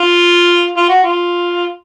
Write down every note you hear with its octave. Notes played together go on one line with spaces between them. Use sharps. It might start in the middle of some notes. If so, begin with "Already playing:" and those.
Already playing: F4
F4
F#4
F4